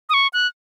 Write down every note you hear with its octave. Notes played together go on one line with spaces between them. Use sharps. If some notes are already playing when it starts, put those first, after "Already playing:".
D#6
C#6
F#6